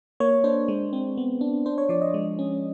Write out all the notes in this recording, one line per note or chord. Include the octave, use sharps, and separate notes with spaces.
A#3 C#5
D4 C5
G#3
C4
B3
D4
D4 C5
C#5
F3 D5
D#5
G#3
C#4